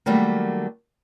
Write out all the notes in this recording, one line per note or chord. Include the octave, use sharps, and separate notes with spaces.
D#3 F#3 G3 A3 A#3